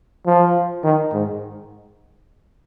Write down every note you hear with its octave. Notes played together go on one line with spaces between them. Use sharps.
F3
D#3
G#2